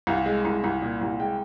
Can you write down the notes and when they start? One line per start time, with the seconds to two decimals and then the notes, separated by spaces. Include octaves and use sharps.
0.07 C2 F5
0.26 G#3
0.45 C2
0.64 C2
0.82 A#2
1.01 C2
1.19 G#3 G5